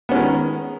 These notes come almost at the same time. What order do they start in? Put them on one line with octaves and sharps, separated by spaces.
B3 C#4 G#3 D#3